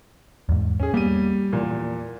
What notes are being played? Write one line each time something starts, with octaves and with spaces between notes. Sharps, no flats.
E2 G#2
C#4 G#4
G3 A#3 B3 D#7
E2 A#2